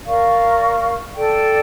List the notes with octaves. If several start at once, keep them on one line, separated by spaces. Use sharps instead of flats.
A#4 D5 F5 C#6
A4 D5 G5